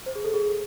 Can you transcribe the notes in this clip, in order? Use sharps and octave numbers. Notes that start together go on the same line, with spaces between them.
C5
G#4
A4
G#4